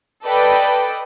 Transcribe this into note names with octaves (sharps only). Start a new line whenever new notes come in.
A4 B4 D5 D#5 G5